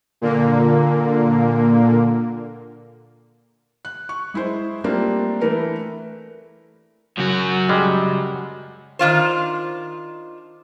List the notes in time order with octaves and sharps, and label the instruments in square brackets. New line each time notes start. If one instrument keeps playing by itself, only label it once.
[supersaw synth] A#2 D3 A#3
[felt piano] F#6
C#6
G#3 E4 G#4 C5
G3 A3 A#3 C4 D4 F4
E3 A3 E4 A#4 B4
[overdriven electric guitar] F#2 F#4 [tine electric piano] C#3 F#3
[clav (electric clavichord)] G3 G#3
[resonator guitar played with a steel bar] D#3 D4 F4 C5